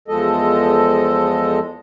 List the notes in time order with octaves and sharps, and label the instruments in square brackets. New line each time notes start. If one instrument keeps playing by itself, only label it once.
[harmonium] E2 F3 G#3 A4 D#5